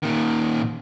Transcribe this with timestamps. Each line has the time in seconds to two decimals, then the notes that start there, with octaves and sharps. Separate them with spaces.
0.03 A#2 D#3